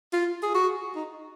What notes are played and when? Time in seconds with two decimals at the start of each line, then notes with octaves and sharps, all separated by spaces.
0.13 F4
0.43 G#4
0.54 F#4
0.96 D#4